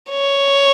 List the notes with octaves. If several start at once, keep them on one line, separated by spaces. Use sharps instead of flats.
C#5